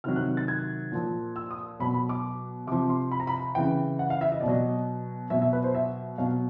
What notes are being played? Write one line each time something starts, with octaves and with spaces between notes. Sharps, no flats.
C3 D#3 F#3 F6
F#6
A6
G#6
A#2 F3
E6
D#6
B2 F#3 B5
B5
D6
C3 F3 D6
C6
B5
A#5
B5
C#3 E3 G5
F#5
F5
E5
D#5
B2 D5
F#3 D#5
B2 F#3 E5
E5
B4
C5
E5
B2 F#3 F5